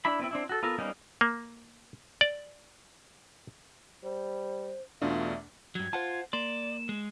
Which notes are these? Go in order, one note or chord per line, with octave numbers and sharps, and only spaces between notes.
D4 E4 B5
B3 C4 E4
C4 D4 E4
F#4 A4
B3 F4 A4 A#4
G3 A#3 B3 C#4 D#4
A#3
D5
G3 C5
E2 B2 A3 D4 F4 E5
G2 F#3 G#6
F4 C5 F#5 A5
A#3 D5 C6 E7
G#3